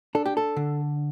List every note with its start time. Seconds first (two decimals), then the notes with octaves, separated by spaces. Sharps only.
0.15 D4 A4
0.26 G4
0.37 A4
0.57 D3